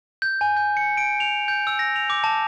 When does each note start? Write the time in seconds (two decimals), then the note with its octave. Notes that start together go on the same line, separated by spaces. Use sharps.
0.22 G6
0.41 G#5
0.57 G6
0.77 C#7
0.97 D7
1.20 F7
1.48 G6
1.67 E6
1.79 A#6
1.96 F7
2.10 D6
2.24 A5